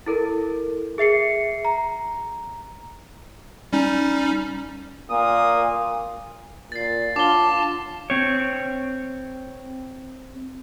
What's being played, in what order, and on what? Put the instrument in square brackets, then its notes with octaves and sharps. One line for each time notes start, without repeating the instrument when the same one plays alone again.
[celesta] E4 A4 A#4
G#4 E5 C7 C#7
A#5
[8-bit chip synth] G3 C#4 D#4
[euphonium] A#2 [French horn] A#3 [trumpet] D#6
[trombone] A#2 [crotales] A6 C7
[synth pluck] D4 C#5 F#5 [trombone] F4 [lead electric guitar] A5 [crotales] D6 G7
[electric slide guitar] C4 C#5